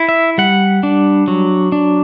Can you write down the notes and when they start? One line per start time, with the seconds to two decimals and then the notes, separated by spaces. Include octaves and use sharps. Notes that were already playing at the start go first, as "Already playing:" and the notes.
Already playing: E4
0.09 E5
0.38 G3 F#5
0.83 D4
1.28 F#3
1.72 D4